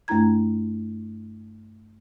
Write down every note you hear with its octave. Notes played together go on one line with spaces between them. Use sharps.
G2 A3 D4 E4 A#5 G#6